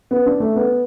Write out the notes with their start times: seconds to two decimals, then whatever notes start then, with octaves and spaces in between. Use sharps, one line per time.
0.11 B3
0.26 D4
0.40 A3
0.56 B3